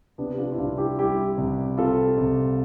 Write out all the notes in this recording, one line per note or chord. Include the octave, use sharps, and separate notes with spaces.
C3 B3 D4
G4
D4 F4
E4
C2 D4 F4
E4 G4
G3 E4 G4
C2
C3 F4 A4
C2